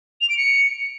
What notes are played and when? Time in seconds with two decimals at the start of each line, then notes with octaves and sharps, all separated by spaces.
0.21 F7
0.29 D7
0.37 C#7